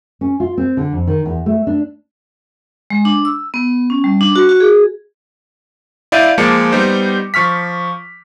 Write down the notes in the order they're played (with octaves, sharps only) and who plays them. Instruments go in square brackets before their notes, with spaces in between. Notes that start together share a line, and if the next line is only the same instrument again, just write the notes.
[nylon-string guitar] C#4
F4
C4
D3
F2
D#3
E2
A3
D4
[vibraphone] G#3
D4
E6
B3
C#4
G3
D4
F#4
F#4
G#4
[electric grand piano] E4 D5 F5 G6 D#7
F3 G#3 A#3 A5 D6 C#7
G3 B3 D#4 C5
F3 C#6 F6 B6